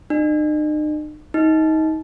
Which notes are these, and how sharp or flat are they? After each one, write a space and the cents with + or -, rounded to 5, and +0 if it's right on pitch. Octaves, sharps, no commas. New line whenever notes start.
D#4 -45
D#4 +25